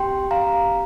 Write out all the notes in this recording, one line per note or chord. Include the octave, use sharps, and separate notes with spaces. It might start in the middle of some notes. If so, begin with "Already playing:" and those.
Already playing: C4 G4 G5 C6
F5 A#5